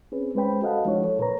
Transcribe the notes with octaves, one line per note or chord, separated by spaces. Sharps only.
C4 C#4 G#4 B4
G#3 C#4 B4 C5 G5 B5
F#4 A4 D#5 F5 F#5 A5
F3 G#3 D4 E4 C#5
A4 C#5
A#2 A#4 B4 C#5 A#5